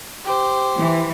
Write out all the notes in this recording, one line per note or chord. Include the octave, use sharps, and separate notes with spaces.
G4 C5
E3